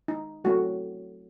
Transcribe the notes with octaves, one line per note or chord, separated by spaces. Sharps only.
D#4
F#3 A3 C4 F#4